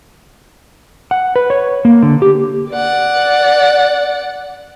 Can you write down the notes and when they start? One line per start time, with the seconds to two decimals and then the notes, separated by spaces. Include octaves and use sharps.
1.11 F#5
1.36 B4
1.50 C#5
1.85 A#3
2.02 D3
2.22 G4
2.71 D5 F#5